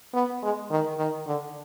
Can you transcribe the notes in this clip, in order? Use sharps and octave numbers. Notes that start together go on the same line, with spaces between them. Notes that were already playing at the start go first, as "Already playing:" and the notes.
B3
G#3
D#3
D#3
D3